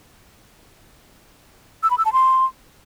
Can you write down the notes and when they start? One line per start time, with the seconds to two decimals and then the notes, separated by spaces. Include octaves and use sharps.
1.83 E6
1.90 B5
1.98 E6
2.05 A5
2.13 C6